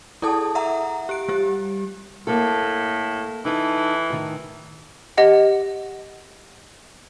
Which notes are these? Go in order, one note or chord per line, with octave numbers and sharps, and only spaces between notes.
E4 G#4 A4 A5 D#6
E5 F#5 A#5
G4 D7
G3 G4
A2 A#3 A4
E3 D#4 A4
A2 D#3
G4 D#5 F#5